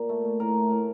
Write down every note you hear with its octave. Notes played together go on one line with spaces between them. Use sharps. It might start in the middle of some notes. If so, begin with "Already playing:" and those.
Already playing: A#2
A3
A3
A2 A#4
A3
A2